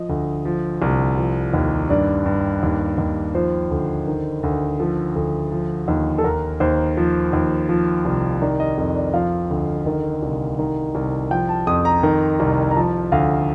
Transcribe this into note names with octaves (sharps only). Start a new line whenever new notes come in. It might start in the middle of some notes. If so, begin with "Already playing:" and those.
Already playing: F3 D#5
D2
F3
C2
F3
D#2
G2 D5
G2
D#2
D#2
F3 C5
D2
D#3
D2
F3 A4
D2
F3
D#2
A4
D#2 A#4
D#2 C5
F3
D#2
F3
C2
D#3 D5
D#5
F2
D5
F3 F5
D2
D#3
C2
D#3
C2
F3 G5
A5
F2 D#6
A#5
D#3
C2
A#5
F3 A5
D2 F5